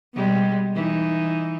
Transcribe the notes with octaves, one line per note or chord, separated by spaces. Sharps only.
B2 G3 G#3
E3 D#4